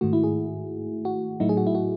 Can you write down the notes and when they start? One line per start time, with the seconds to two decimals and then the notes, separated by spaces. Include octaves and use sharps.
0.01 G#2 D#3 A3 F#4
0.13 E4
0.24 G#4
1.05 F#4
1.40 A2 F#3 A3 D#4 E4
1.49 G#4
1.57 F#4
1.67 E4
1.75 F#4